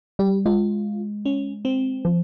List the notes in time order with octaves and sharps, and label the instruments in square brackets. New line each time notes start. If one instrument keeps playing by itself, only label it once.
[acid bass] G3 [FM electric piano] G4
[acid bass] G#3 [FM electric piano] F4
[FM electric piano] C#4
C4
[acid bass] F3